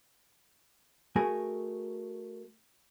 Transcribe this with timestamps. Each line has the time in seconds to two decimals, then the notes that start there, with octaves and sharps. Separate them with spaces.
1.16 A3 F#4 G#4 A#4 G#5